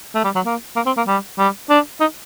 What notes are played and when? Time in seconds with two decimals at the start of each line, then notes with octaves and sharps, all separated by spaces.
0.15 A3
0.24 G3
0.35 F#3
0.46 A#3
0.76 A#3
0.86 C4
0.97 A#3
1.08 G3
1.38 G3
1.70 D4
2.01 D#4